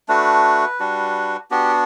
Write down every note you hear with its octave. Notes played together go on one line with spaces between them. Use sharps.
A3 D4 F#4 B4
G3 D4 F#4
B3 D4 F#4 G4